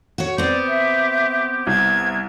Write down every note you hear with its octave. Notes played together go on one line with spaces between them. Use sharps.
F#4 C#5
B3 C4 G4 D5
E5
C2 G#6